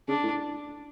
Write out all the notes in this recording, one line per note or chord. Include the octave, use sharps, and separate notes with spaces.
C#3 D4
A2